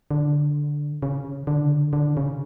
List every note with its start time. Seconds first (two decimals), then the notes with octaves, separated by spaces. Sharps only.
0.11 D3
1.02 C#3
1.47 D3
1.93 D3
2.17 C#3